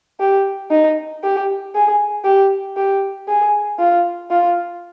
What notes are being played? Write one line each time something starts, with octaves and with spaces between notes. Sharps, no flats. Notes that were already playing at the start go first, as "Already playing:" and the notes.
G4
D#4
G4
G#4
G4
G4
G#4
F4
F4